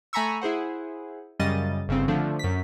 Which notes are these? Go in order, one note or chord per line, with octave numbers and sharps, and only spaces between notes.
A3 G#5 A#5 B5 C#6 E6
E4 G#4 C5 F#5
F#2 C#3 G3 D#5 A6 D#7
G1 C#3 C4
D3 F3 A3 D4
F#2 B6